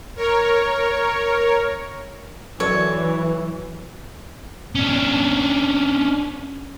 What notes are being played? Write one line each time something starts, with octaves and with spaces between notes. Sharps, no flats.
A#4 C#5
E3 F#3 A4 C#5 D5
C#4 D4